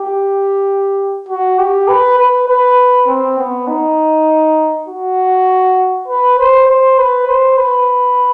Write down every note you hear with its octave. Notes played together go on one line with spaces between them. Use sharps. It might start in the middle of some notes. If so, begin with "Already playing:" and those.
Already playing: G4
F#4
G4
B4
B4
B4
C4
B3
D#4
F#4
B4
C5
C5
B4
C5
B4